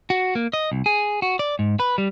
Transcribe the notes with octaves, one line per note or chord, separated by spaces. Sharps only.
F#4
A#3
D#5
C2
G#4
F#4
D5
G#2
B4
G3